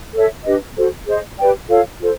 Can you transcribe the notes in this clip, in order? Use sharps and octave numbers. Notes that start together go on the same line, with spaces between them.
A4 C#5 E5
D4 G4 B4 D#5
F#4 A4 C5
G#4 C5 D#5
G4 B4 D5 G5
F4 A4 C#5 F5
F4 A4 C5